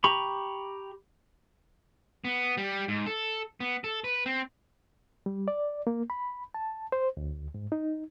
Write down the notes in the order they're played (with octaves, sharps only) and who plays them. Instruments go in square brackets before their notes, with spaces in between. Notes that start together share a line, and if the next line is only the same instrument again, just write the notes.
[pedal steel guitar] G4 A#5 B5 C#6
[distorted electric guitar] B3
G3
G#2
A4
B3
A4
B4
C4
[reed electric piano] G3
D5
A#3
B5
A5
C5
D2
G#2
D#4